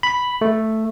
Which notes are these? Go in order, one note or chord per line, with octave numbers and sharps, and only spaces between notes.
B5
A3